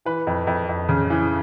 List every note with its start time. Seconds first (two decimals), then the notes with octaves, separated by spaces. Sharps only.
0.05 E3 B4
0.27 F2
0.47 F2
0.69 F2
0.89 C#3
1.10 E3